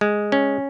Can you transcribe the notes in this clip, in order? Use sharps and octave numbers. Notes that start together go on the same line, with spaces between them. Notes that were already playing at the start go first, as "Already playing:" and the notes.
G#3
C#4